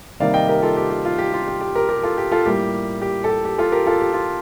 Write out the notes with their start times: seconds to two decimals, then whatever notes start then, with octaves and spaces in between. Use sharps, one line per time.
0.20 C3 D#3 G3 A#3 D5 F5
0.34 D#5 G5
0.48 G4 A#4
0.62 F4 A4
0.77 G4
0.90 G4
1.05 F4
1.18 G4
1.33 F4
1.47 G4
1.61 G4
1.75 G4 A#4
1.89 G4 A#4
2.03 F4 A4
2.18 G4
2.32 F4 A4
2.46 A2 G3 A#3 G4
3.02 G4
3.24 A4
3.30 G4
3.45 G4
3.58 F4 A4
3.72 G4 A#4
3.87 F4 A4
4.00 G4
4.13 F4